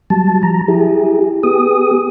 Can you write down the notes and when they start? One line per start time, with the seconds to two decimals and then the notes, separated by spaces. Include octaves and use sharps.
0.10 F#3 G3 A5
0.43 F3 A#5
0.68 E4 G4 G#4
1.43 B3 G4 G#4 D#6